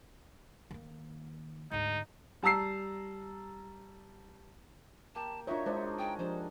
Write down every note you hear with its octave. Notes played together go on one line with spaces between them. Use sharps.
D#3 A#3
D2 G#2 D#4
G3 A5 A#5 E6 C7
A#3 G4 A5
D4 D#4 F4 F#4 A#4 C#5 E5
G#3 D4 D#4 C5
G#4 G5
F3 D4 G4 C5 C6